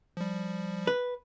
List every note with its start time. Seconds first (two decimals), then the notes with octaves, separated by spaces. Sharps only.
0.17 F3 G3
0.87 B4